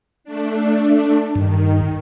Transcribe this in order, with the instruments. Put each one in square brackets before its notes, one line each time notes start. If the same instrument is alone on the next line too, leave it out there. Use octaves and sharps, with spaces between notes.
[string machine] A3 D4
[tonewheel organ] G2 [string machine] D#3